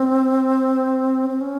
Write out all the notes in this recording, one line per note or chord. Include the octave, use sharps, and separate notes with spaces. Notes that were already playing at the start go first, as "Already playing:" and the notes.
Already playing: C4
C4
C#4